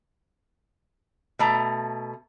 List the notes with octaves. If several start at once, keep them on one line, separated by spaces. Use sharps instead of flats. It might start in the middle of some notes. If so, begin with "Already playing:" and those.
B2 A3 A#5